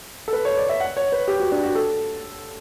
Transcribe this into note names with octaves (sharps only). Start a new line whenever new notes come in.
A4
B4
C#5
D5
E5
F#5
C#5
B4
G4
F#4
D4
F#4
A4